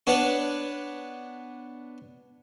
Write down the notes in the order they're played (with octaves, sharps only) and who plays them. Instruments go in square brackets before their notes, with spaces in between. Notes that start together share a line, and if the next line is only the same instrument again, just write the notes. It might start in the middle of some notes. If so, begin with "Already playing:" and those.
[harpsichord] B3 D4 C#5